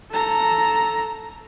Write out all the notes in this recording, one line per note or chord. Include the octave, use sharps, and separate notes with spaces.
A4 A#5